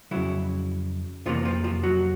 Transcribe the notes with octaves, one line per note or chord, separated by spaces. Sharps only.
F2 C#3 E3 F#3 E4
F2 C3 E3 F3 G3 A#3 F4
F3 F4
F3 F4
F#3 F#4